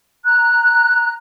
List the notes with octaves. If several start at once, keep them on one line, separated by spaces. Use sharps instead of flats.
A#5 F#6